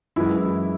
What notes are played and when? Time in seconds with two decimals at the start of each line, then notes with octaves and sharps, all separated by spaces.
0.16 F#2 E3 G#3 E4